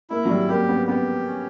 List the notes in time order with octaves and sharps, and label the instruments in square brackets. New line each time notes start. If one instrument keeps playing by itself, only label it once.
[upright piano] A#3 [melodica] E4
[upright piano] F#3
G3
[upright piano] A#3 [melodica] G4
[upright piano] B3
[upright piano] B3 [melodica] G4
[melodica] C#4